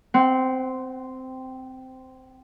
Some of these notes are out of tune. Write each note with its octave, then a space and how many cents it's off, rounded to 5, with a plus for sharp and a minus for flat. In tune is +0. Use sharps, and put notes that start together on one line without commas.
C4 -10 F#5 +30